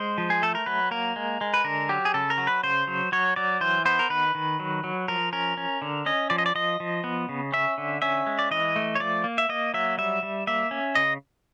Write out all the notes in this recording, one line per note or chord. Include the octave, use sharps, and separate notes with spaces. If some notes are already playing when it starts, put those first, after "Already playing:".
Already playing: G#3 C5
F3
G#4
A3 A4
A#4
F#3 B4
A#3 A#4
G#3
G#3
B4
D3 A#4
F#3 G4
G#4
C#3 A4
A#4
F#3
B4
C#3 C5
F#3
F#3 C#5
F#3 D5
E3 C5
B3 C5
A#4
D#3 B4
D#3
F#3
F#3
F3 A#4
C#4 A#4
C#4
D3
C#4 D#5
F3 D5
D#5
D5
F3 D#5
F3
B3
C#3
C#4 E5
D3
C#4 E5
G#3
D5
E3 D#5
A3
C#5
F3 D5
A#3
E5
A#3 D#5
F#3 E5
G3 E5
G3
A#3 E5
C#4
C#3 D#5